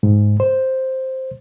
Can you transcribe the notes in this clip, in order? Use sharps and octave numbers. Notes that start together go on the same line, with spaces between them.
G#2
C5